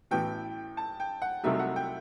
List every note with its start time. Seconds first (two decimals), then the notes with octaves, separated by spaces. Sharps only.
0.11 A1 A2 E3 B3 F#4 G5
0.77 A5
1.00 G5
1.22 F#5
1.43 C2 C3 F#3 A3 D#4 E5
1.59 F#5
1.76 G5